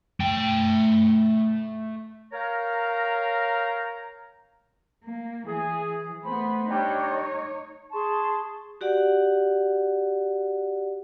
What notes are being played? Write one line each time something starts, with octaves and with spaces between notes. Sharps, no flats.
A3 G5
A#4 C#5 F5 G5 A#5
A#3
E3 G#4
A3 B3 C5 B5
G3 D4 D#4 C#5 G5
G#4 A5 C6 C#6
F#4 G4 D5 F#5